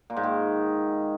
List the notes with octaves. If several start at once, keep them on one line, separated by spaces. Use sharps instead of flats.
A#2
G#2
D#3